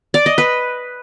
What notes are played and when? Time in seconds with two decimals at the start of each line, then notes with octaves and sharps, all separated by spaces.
0.14 D5
0.26 D#5
0.38 B4